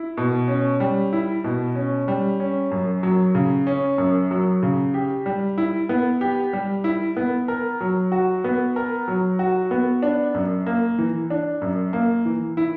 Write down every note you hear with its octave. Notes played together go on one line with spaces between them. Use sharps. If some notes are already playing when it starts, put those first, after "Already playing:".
Already playing: E4
B2
C#4
G3
E4
B2
C#4
G3
C#4
F#2
F#3
C#3
C#4
F#2
F#3
C#3
G4
G3
E4
B3
G4
G3
E4
B3
A#4
F#3
F#4
B3
A#4
F#3
F#4
B3
D4
F#2
A#3
E3
D4
F#2
A#3
E3
E4